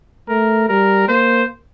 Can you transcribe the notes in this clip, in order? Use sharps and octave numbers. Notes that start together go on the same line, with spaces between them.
A3 A#4
G3 A#4
A#3 C5